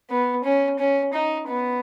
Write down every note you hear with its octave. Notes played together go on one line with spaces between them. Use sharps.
B3
C#4
C#4
D#4
B3